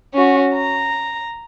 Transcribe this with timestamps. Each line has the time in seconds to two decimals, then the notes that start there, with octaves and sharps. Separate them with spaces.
0.14 C#4 F#4
0.55 A#5